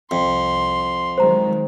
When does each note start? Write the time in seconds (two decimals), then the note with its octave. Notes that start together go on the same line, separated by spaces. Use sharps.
0.11 C2 F2 C6
1.18 D#3 F#3 G#3 C5 A#5